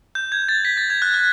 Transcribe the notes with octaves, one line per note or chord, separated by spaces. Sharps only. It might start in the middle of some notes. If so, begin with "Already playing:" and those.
G6
G#6
A6
B6
A6
G#6
F#6
F#6